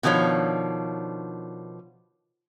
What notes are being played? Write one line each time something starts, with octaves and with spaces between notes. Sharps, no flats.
B2 D#3 F3 D4 C#5